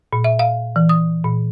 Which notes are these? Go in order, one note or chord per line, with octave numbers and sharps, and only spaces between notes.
A#2
E5
F5
E3
D#6
A#2